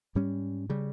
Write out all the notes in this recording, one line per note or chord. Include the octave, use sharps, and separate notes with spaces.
G#2 G3 C#4
C#3 G3